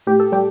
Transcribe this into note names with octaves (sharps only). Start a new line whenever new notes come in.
A2 G4
A4
G3 G4